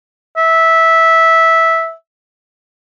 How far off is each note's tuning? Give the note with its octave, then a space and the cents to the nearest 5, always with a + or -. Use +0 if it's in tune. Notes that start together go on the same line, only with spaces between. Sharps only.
E5 -10